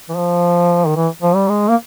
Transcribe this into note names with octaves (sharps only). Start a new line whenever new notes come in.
E3
F3
D#3
E3
F3
G3
G#3
A#3